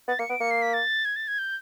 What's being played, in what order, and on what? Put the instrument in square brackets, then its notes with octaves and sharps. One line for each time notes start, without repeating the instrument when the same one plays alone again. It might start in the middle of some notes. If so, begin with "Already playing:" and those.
[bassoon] B3 [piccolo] A6
[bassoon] A#3 [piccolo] C#7
[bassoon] B3 [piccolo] D7
[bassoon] A#3 [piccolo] C#7
[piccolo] C7
B6
A6
G#6
A6
G#6
G6